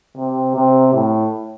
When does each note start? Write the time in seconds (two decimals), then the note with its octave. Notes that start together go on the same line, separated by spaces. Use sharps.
0.17 C3
0.55 C3
0.94 A2